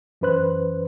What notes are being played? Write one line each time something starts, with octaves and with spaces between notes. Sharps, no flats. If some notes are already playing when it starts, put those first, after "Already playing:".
F#2 E3 C#4 B4 C5 F#6